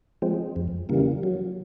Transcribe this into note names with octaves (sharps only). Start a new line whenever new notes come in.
F3 G#3 C4
F2
C#3 E3 G3 A#3
F#3